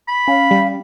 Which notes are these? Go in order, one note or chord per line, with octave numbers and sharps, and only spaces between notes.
B5
C#4 F5
G3